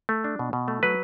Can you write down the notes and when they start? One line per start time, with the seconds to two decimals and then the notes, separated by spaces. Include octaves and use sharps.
0.09 A3
0.24 D4
0.39 B2
0.53 B2
0.68 A3
0.83 F#3 B4